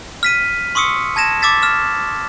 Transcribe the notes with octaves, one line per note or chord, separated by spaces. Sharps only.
F6 B6 D#7
C6 C#6 D#6 E6 C#7
A5 G#6 A#6 E7
D6 E6 A6 B6
F6 E7